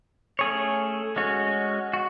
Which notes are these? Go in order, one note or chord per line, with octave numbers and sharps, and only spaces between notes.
A3 C#4 G#4 C#5
G#3 C#4 F#4 C#5
F#4